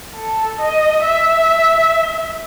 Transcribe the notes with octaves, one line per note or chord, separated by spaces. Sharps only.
A4
D#5
E5